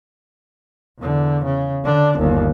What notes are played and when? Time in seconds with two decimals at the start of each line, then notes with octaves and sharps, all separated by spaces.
1.00 E2 D3
1.44 C#3
1.84 D3 D4
2.18 G1 D#2